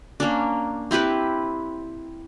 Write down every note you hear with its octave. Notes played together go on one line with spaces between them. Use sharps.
A#3 C#4 D4
C4 E4 G4 B4